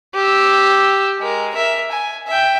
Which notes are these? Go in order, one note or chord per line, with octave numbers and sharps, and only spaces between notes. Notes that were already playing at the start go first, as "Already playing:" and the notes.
G4 E6
G#3 A#4
A#4 E5
G#5
E5 G5